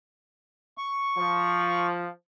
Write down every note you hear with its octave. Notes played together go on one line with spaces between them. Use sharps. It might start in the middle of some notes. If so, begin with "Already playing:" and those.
C#6
F3